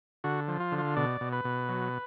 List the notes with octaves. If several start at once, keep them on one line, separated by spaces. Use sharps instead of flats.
D3 F#4
F3
F4
D3
F4
B2 D5
B2
B4
B2
F#3